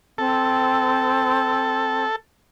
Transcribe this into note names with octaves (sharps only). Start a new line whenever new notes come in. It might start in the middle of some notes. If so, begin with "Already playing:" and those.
C4 A4